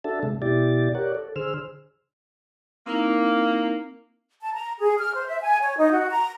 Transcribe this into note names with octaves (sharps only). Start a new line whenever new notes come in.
D4 F#4 A4 E5 A5
C3 G#3
B2 E4 G4 D5 A6
G4 A#4 C#5 D5 F#5
A4
D3 G#4 C5 E6 F6
A#3 C4 D#4 E4
A5
A#5
G#4
F6
C5
E5
G#5
C#5
D#4
F#4
A#5